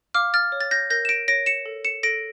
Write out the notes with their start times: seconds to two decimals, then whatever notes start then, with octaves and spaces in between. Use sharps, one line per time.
0.14 F5 D6 F6
0.34 F6 A6
0.52 C#5
0.60 A6
0.71 G6 A#6
0.90 A#4 G6 A#6
1.05 E7
1.09 A#6 D7
1.28 C#5 A#6 D7
1.46 C#7 E7
1.66 A4
1.85 C#7 E7
2.03 A4 A#6 D7